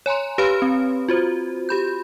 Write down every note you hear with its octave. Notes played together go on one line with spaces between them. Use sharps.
C#5 G#5 A#5 C6
G4 B4 C#5 F5 B5 F6
C4
F4 F#4 C5
G4 B5 G6